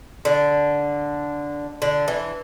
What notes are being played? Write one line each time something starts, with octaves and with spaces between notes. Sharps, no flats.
D3
D3
E3